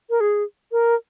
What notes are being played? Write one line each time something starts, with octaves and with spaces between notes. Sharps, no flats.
A#4
G#4
A#4